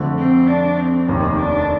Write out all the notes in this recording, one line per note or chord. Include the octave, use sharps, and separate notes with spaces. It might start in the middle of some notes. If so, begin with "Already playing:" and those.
Already playing: F2 D3 A3
C4
D4
C4
F1 D#2 D#3 A#3
D4